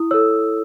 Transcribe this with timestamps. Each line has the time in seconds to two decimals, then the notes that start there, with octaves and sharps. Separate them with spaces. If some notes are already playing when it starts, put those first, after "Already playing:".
Already playing: E4 D#6
0.11 A4 C#5 E6